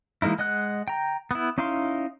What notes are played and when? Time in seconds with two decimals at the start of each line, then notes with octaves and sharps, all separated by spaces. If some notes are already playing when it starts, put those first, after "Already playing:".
0.22 E3 G#3 A#3 D#4 E4
0.39 G#3 D#5 F#5 F#6
0.88 G5 A#5
1.31 B3 E4
1.58 C#4 D#4 E4 F5 C6